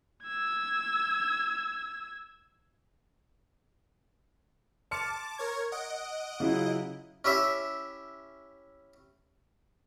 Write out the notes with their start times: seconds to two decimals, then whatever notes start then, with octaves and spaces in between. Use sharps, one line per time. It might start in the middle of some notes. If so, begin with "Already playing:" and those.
0.25 E6 G#6
4.91 A5 C6 D6 F6 A6 C#7
5.38 A#4 C#5 G#6
5.72 D#5 F#5 D7
6.40 C#3 F#3 E4 F4
7.25 C#4 E4 G4 E5